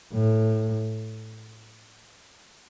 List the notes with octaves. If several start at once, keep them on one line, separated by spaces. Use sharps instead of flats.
A2